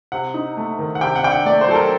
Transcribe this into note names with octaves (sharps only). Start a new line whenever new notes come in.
C3 F#5
D#4
A3
D#3
F#5
C3 G5
F#5
D4 G5
F#5
A3 D5
C5
F#3 A4
A#4